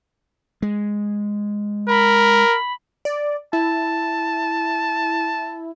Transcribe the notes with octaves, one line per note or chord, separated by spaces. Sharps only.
G#3
A#4 B5
D5
E4 A5